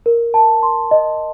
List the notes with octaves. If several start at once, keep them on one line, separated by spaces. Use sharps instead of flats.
A#4
A5
C6
D#5